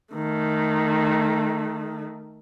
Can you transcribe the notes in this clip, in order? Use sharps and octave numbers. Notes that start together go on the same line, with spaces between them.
D#3 A3